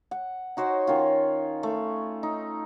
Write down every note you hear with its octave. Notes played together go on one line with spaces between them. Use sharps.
F#5
D#4 F#4 C5 C#5
D#3 C#4 F4
A3
D#4